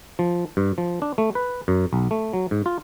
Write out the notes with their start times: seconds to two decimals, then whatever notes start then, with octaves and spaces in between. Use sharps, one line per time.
0.19 F3
0.57 G2
0.78 F3
1.02 D4
1.18 A3
1.35 B4
1.68 F#2
1.93 B1
2.11 A3
2.33 F#3
2.51 G#2
2.66 F4